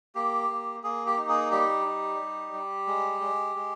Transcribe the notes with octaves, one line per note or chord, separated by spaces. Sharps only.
A#3 G4
A#3
A#3 G#4
G4
D#4
G#4
G3 G4
D#4
G3
G3
G#3
G#3
G#3